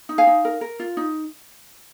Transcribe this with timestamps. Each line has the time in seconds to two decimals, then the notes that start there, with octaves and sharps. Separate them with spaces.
0.09 D#4
0.18 F5 G#5
0.27 D#4
0.45 A#4
0.61 A#4
0.80 F4
0.97 D#4